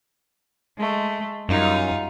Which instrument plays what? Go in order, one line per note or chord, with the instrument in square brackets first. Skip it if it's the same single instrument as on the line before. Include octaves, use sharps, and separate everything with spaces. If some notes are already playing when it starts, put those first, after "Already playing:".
[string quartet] G#3 A3
[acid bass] F#2 [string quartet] G3 D#4 F4